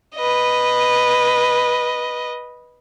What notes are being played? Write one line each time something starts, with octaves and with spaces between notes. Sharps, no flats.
B4 D#5